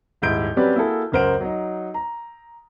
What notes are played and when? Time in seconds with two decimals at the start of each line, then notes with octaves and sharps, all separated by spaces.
0.22 D#1 G#2 E4 G6 D7
0.57 F#3 G3 C4 C#4 B4 D5
0.75 A#3 E4 F#4 G#4 A4
1.12 C#2 F#2 A#4 C5 F#5 D7
1.40 F#3 D#4
1.94 A#5